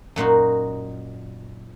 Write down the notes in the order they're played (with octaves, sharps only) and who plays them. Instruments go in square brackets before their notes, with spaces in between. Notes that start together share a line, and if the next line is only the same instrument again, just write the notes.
[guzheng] F#2 A#2 D#4 F#4